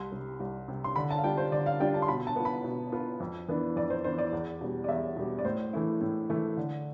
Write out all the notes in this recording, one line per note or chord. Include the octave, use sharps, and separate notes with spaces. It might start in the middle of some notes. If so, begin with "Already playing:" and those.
Already playing: C2 C6
C3 G3
C2
C3 G3
C6
D3 B5
A5
F5
G3 D4 F4 G5
C5
D3 D5
F5
G3 D4 F4 G5
A5
C6
B2 B5
A5
B3 F4
B5
B2
B3 F4
F2
E3 B3 D4
F2 D5
C5
E3 B3 D4 C5
D5
E2
B2 G3
D5
E2 E5
B2 G3
D5
A2 C5
E3 A3 E4
A2
E3 A3 E4
D3